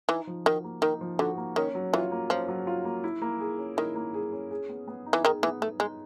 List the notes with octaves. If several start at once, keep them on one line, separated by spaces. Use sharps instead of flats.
E3 D#4
F3
D#3 F#4
A#3
D#3 D#4
F3
D3 F#4
A#3
D#3 C#4
F#3
E3 F4
A#3
F3 C#4
F#3
F4
A#3
E4
A#3
G#4
C#4
D#3 E4
A#3
G#4
C#4
G#4
B3
B3
D#4
E3
D#3 G#4
E3 B3
A3 B3
G#3 D#4